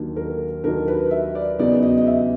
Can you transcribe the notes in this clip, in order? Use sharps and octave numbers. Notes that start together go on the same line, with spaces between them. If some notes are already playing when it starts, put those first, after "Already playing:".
Already playing: D#2 D#3 F#3 A#3 D4
A#4
D#2 D#3 F#3 A#3 D4 A#4
B4
E5
D5
E2 C#3 F#3 B3 D#4 D5
D#5
D#5
E5